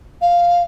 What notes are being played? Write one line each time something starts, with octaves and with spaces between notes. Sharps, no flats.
F5